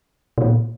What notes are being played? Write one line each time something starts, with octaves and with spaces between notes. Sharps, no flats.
B2
A#2